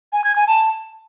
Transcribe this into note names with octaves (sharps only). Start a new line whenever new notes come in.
G#5
G#6
G#5
A5